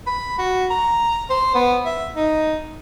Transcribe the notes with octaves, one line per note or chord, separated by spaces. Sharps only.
B5
F#4
A#5
C5
B3
E5
D#4